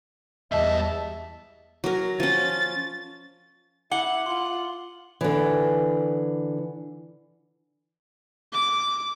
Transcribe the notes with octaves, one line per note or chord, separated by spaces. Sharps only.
E2 G#2 G3 D#5 E5 A5
F#3 A#4
F3 C#4 A6
E4 F#5 D6 F#7 G7
F4 C6
D3 E3
D6